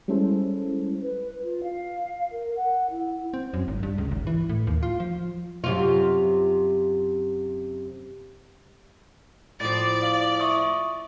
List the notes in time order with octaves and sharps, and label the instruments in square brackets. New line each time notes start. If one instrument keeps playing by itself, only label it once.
[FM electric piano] G3 G#3 C#4 E4 A4 C5
[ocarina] B4
F4
F5
A#4
F#5
E4
[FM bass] C4
F#2
G#1
G2
C#2
G#1
E3
A2
D#2
F4
F3
[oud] F#2 C3 F4
[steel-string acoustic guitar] A2 F3 [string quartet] D5 [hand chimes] A6
[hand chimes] F5
E5 C#6 D#6